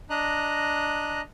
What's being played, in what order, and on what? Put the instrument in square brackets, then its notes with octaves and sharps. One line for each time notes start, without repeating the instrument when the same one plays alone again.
[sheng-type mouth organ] D4 D#5 A#5 F#6